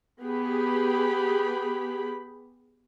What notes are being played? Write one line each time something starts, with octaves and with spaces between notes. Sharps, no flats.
B3 G4 G#4 B5